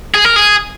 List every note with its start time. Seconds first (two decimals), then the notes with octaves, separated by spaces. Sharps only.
0.14 G#4
0.25 A#4
0.36 G#4